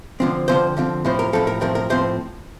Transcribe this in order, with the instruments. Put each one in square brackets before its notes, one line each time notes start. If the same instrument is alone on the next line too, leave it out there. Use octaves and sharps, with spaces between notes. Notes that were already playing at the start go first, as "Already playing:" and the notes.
[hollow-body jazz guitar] D3 F3 C4
D3 F3 C4 C5
D3 F3 C4
A2 F3 C4 C5
A#4
A2 F3 C4 A4
A#4
A2 F3 C4 A#4
A#4
A2 F3 C4 C5